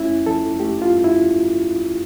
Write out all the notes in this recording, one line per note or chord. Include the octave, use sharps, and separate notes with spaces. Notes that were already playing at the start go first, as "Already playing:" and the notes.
Already playing: F2 A3 C#4 E4
F3 A4
A3 G4
F4
G2
E4